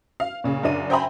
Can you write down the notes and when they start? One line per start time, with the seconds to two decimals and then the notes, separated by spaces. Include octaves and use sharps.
0.20 F5
0.44 A#2 C#3
0.63 F#2 C#3 D4 D#7
0.90 C5 E5 G5 G#5 A#5 B5